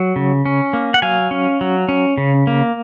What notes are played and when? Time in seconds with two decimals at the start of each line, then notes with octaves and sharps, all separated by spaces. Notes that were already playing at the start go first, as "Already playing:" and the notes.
Already playing: F#3
0.16 C#3
0.46 C#4
0.73 A#3
0.94 F#5
1.02 F#3 F5 G#5
1.31 C#4
1.61 F#3
1.89 C#4
2.18 C#3
2.47 A#3